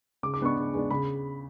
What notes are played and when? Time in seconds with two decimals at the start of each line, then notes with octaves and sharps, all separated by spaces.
0.23 C#3 D6
0.34 D6
0.40 G#3 B3 D4 C#6
0.57 C#3
0.74 G#3 B3 D4
0.91 C#3 B5